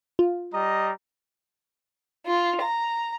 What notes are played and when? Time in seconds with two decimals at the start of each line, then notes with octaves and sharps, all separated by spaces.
0.19 F4
0.54 G3 D#5 A#5
2.26 F4
2.62 A#5